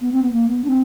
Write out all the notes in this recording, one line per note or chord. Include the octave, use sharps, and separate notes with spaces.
B3
C4
B3
A#3
B3
D4
C4